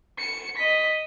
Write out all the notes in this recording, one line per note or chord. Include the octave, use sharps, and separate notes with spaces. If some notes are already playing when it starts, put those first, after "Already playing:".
C#7
D#5 B6